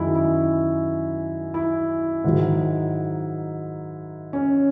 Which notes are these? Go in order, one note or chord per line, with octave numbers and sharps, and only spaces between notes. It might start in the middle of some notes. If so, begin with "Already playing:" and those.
Already playing: F#2 D#3 G#3 E4 F#4
E4
E4
G#2 D#3 F#3
C#4